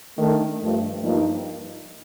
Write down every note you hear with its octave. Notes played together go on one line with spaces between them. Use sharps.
D#3 A3 D4
G2 F3 A3
G2 F3 A#3 D#4